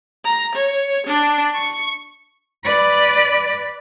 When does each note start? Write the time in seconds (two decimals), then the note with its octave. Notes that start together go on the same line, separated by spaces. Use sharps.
0.25 A#5
0.55 C#5
1.07 D4
1.56 C#6
2.65 B4 D5